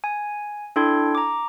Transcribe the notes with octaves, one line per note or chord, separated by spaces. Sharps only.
G#5
D4 E4 A4 G5 C6 G#6
A#5 D6